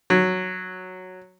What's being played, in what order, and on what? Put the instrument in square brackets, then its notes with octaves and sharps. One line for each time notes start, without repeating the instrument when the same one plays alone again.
[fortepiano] F#3